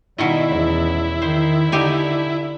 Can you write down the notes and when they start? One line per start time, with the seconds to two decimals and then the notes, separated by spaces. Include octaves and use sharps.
0.18 B2 D#3 G3 E4 D#5
0.49 E2 C#4
1.22 D#3 C5
1.72 D3 D#4 G4 G#5